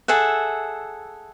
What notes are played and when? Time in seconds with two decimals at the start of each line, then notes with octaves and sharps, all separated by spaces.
0.08 G#4 A4 E5 F#5